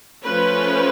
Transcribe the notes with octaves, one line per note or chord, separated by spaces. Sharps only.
F3 A3 C#4 B4